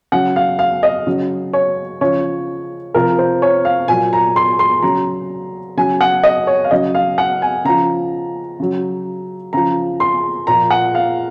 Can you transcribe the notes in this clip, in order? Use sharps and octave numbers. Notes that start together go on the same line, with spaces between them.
C#3 F#3 F#5
F5
F5
D#5
C#3 F#3
C#5
C#3 F3 C#5
C3 F3 A#4
C5
C#5
F5
A#2 F#3 G#5
A#5
C6
C6
C#3 F#3 A#5
C#3 F#3 G#5
F#5
D#5
C#5
F5
C#3 F#3 D#5
F5
F#5
G#5
C#3 F3 A#5
C#3 F#3
C#3 F3 A#5
C6
A#2 F3 A#5
F#5
F5